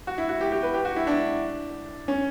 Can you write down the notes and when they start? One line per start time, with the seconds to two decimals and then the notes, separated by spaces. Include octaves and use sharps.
0.07 F#4
0.18 E4
0.29 F#4
0.41 G4
0.52 G4
0.63 B4
0.74 G4
0.85 F#4
0.96 E4
1.07 D4
2.08 C#4